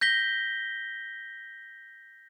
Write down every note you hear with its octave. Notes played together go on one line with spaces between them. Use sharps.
G6 A#6 B6 G7